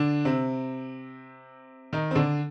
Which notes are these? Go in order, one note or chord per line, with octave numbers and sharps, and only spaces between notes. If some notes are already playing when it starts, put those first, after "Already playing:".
Already playing: D3 D4
C3 C4
D#3 D#4
C4
D3 D4